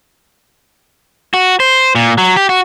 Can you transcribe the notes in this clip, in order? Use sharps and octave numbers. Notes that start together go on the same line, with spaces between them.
F#4
C5
A#2
F#3
G4
F#4